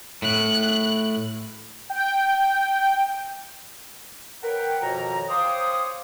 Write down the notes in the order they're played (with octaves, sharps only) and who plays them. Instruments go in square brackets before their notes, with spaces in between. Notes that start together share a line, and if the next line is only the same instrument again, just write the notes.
[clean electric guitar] A2 [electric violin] F#6
[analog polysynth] G5
[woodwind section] A#4 B4 C#5 F#5 G5
F2 B2 D#3 F3 C#5 A#5
C5 C#5 F5 G5 D6 D#6